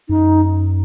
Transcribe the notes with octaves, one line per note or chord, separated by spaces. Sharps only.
F#2 D#4